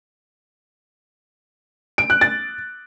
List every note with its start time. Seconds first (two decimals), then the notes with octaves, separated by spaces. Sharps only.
1.98 D7
2.10 F#6
2.21 A6